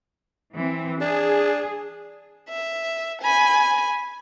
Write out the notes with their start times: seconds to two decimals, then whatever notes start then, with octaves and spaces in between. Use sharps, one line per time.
0.55 E3 C4
1.01 D4 G#4
2.49 E5
3.22 G#5 B5